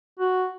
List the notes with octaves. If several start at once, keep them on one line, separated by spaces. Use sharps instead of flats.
F#4